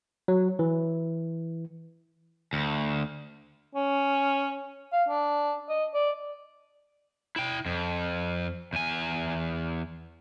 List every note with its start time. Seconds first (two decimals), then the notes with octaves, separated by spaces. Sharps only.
0.28 F#3
0.59 E3
2.53 D2
3.75 C#4
4.92 F5
5.09 D4
5.69 D#5
5.94 D5
7.36 E4 G5
7.66 F2
8.73 E2 G#5